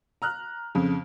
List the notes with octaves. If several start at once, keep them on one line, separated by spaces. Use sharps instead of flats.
A#5 F6 F#6
F2 C#3